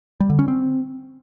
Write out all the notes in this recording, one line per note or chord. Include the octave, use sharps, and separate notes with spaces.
G3
D3
C#4
C4